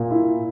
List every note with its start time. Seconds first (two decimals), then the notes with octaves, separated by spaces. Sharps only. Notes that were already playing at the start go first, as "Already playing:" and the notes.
Already playing: A#2
0.11 E4